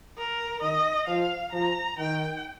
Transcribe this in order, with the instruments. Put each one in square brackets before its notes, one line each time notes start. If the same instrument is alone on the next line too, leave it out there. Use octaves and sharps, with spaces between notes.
[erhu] A#4
[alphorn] D#3 [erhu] D#5
[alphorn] F3 [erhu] F5
[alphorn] F3 [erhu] A#5
[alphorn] D#3 [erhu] G5